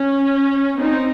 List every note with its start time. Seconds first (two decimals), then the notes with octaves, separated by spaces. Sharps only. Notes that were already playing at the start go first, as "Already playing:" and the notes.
Already playing: C#4
0.80 C4 D#4